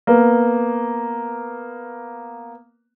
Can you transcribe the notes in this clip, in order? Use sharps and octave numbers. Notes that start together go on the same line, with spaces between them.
A#3 B3